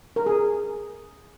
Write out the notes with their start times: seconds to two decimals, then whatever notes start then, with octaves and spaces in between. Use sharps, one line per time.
0.16 A#4
0.26 G#4